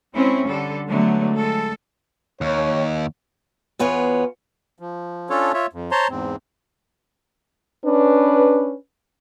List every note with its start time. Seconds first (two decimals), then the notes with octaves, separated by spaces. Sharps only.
0.14 G#3 C4 C#4 E4
0.47 D3 G3 A4
0.88 D3 F#3 G#3 A3 B3
1.34 G#3 A4
2.41 D#2 C#5
3.79 E2 B3 F4 C#5
4.79 F3
5.30 C#4 D4 F4 A4 C#5
5.54 F4 C#5 E5
5.73 F2
5.91 C5 C#5 A5 A#5 C6
6.10 E2 G#2 C4
7.85 C#4 D4 B4